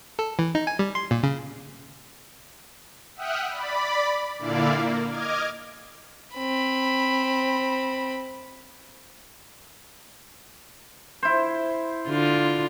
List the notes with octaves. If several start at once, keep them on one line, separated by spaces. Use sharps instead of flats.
A4
E3
D#4
G#5
G3
C6
A#2
C#3
E5 F#5 G5 D#6 F6 F#6
D5 B5
A#2 D3 E4 D5 F5
A#3
D#5 D6 F6 G#6
C4 B5
E4 C5
D3 F4